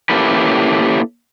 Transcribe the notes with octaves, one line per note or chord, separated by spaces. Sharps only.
A#3 C#4 E4 G4 A4 B4